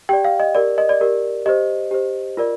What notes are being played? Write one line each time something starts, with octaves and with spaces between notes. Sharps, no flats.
G4 D5 G5
F5
D#5
G4 A#4 D5
D#5
D5
G4 A#4 D5
G4 C5 D#5
G4 C5
F4 A#4 D5